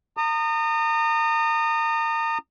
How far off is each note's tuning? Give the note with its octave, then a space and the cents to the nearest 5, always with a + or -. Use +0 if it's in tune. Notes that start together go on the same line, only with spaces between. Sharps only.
A#5 -35 D#6 -25